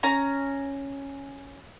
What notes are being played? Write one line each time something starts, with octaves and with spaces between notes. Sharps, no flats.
C#4 A#5